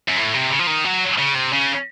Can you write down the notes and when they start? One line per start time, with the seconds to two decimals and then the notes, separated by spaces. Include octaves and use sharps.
0.08 F#2
0.17 A2
0.34 C3
0.50 C#3
0.59 F3
0.67 D#3
0.85 F#3
1.18 C#3
1.34 C3
1.52 C#3